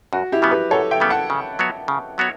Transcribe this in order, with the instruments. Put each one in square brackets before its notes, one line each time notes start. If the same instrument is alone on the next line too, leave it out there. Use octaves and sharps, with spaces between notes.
[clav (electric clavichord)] F#2 [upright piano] F#4
[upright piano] E4 G4
[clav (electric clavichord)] C#3 G3 B3
[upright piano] G4 B4
[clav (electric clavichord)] F#2 [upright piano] A4 C#5
[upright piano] E5 G5
[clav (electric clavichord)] C#3 G3 B3
[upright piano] F#5 A5
[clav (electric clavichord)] C#3
F#3 B3 F#4 C#5
C#3
F#3 B3 F#4 C#5